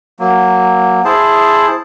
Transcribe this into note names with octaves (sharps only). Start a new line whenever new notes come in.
F#3 A#3
E4 G#4 C5 A5